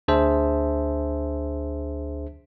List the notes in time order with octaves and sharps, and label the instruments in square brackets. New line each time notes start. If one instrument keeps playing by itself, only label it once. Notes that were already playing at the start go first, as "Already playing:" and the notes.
[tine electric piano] D2 D4 G#4 C5 E5 A5